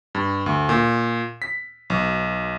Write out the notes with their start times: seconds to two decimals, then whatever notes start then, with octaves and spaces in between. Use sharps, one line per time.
0.15 G2
0.46 D2
0.69 A#2
1.42 B6
1.90 B1